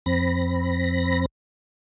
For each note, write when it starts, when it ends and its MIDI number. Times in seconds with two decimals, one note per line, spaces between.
0.06 1.26 41
0.06 1.26 60
0.06 1.26 83
0.06 1.26 94